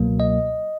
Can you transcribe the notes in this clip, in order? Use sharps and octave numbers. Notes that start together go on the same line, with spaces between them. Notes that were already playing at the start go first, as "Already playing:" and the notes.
Already playing: C#2 B2 F#3 A#3
D#5